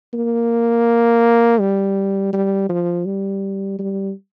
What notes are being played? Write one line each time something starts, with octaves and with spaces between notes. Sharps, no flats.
A#3
G3
G3
F3
G3
G3